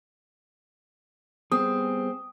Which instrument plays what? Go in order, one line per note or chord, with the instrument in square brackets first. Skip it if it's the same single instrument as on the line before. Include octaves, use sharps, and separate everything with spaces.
[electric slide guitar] G3 B3 G#4 [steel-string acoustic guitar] C4 [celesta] D#6